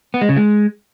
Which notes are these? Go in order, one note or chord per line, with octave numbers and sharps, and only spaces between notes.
B3
G#3
C#3
G#3